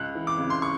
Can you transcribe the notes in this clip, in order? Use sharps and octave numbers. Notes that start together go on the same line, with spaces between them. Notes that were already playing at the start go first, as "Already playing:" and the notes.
Already playing: C#2 F#6
E3
D6
C#3
C6
C#6